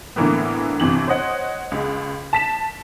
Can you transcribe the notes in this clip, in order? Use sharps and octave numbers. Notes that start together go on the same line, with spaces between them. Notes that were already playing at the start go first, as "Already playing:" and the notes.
A2 D3 E3 A#3 B3
G1 C3 E3 F#7
C5 C#5 D#5 F#5
C#2 G#3
A5 B6 E7